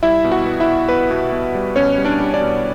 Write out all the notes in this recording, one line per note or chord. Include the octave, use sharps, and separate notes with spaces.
G3 E4 E5
B2
F#4 F#5
B3
E4 E5
B2
B3 B4
B2
B2
G3
B2 C#4 C#5
G3
D4 D5
G3
D4 D5
B2